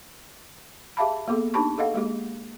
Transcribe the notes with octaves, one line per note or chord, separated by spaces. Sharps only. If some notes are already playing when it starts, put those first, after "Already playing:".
G4 G#4 E5 F5 A5 B5
A#3 B3 G#4 A4
D4 D#4 G4 A5 B5 C#6
G#4 A4 D#5 F5 F#5
G#3 A#3 G4 G#4